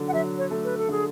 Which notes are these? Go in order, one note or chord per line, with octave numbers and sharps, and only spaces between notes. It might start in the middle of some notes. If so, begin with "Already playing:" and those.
Already playing: D3 F#3
F#5
F#3 E5
C#5
A3
B4
A4
D3 G#4